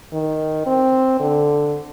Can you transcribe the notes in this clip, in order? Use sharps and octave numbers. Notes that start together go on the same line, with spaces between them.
D#3
C4
D3